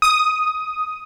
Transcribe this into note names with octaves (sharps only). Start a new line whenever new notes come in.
D#6